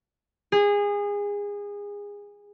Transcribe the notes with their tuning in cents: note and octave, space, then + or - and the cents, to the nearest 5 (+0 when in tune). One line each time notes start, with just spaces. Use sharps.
G#4 -25